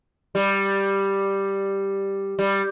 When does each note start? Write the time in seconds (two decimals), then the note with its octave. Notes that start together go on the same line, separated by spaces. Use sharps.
0.35 G3
2.39 G3